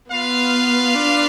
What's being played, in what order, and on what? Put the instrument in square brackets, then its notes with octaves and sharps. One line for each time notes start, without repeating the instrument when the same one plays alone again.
[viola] B3 [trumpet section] F4 B4 F5
[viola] D4